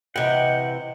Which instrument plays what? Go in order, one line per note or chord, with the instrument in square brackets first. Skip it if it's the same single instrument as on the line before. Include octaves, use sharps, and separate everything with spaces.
[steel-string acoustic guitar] C3 E3 [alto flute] D#5 [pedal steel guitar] F#5 G5